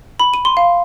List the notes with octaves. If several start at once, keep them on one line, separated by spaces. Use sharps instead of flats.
B5
D#7
C6
F5